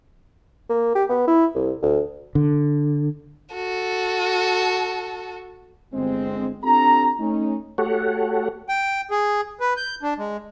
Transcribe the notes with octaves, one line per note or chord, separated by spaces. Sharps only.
A#3
G4
B3
E4
C2
D2
D3
F#4 A4
G1 G#3 C4
C4 D4 F4 G4 A4 A#5
A3 C#4 D#4
A3 F#4 G4 A4 C#5 F#5
G5
G#4
B4
G6
D4
G#3